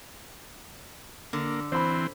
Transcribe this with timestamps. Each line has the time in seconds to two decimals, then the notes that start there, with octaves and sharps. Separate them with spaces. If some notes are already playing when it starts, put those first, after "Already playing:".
1.33 D3 A#3
1.72 E3 C4 C5 B5